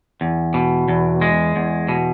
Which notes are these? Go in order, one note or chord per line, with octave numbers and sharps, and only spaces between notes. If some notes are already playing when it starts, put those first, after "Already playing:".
E2
B2
E2
G#3
E2
B2